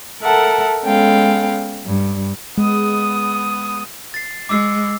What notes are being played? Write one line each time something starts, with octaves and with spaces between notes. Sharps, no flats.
A4 A#4 E5 F#5 A5
G#3 B3 C#4 A4 F5 G5
G2
G#3 B3 D#6
A6 C7
G#3 D6 E6 C7